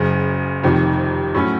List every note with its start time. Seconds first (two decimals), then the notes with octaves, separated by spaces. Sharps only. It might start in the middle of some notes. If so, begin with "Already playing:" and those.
Already playing: F#1 F#2 C#3
0.63 F1 F2 C3 D#3
1.35 A2 F#3 A3 C#4